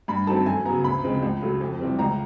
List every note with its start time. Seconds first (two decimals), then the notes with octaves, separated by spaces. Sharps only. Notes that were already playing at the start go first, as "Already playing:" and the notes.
0.08 G2 B5
0.27 D#3 F#3 A3 C4 A5
0.46 F#2 G#5
0.65 C#3 F#3 B3 A#5
0.84 D2 B5
1.03 C#3 F3 G#3 C4
1.22 C#2
1.42 C#3 F#3 A3
1.61 F2
1.79 C3 E3 G3 C4
1.99 C#2 A#5